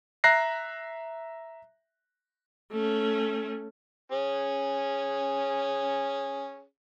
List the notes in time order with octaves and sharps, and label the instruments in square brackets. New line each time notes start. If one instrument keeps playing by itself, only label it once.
[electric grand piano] E5 A#5 F#6 A#6 C7
[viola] A3 C#4
[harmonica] C#4 G#4